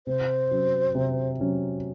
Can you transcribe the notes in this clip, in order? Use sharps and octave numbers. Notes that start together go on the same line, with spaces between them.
C3 C5
F#3 C#4
C3
F#3 C#4